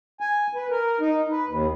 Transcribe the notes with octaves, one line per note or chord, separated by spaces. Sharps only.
G#5
B4
A#4
D#4
B4
D#2